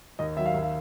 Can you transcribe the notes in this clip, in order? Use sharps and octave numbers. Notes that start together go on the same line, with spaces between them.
D#2 D#5
D#3 F#3 E5
F5
D#2 E5
F5